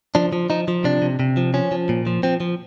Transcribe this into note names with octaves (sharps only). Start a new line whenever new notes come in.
F3 D4
F3
F3 D#4
F3
C3 D4
C3
C3
F3
F3 C#4
F3
A#2
F3
F3 C4
F3